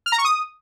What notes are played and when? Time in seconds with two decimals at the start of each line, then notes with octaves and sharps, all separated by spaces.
0.06 F6
0.12 A#5
0.18 C#6
0.25 D#6